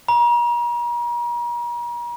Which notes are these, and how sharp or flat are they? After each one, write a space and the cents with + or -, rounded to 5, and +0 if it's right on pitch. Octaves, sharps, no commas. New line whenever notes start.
A#5 +40